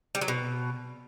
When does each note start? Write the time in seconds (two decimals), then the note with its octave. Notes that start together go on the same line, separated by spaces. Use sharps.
0.15 G3
0.21 F#3
0.28 B2